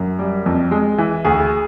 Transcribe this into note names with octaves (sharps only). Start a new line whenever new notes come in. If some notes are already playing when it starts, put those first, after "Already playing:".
Already playing: F#2
G3
F2
G#3
E3
D2 G#4